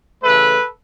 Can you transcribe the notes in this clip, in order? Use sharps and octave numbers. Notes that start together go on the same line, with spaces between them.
C#3 E3 A3 A4 B4